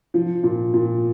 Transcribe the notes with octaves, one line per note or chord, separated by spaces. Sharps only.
F3
A#2
A#2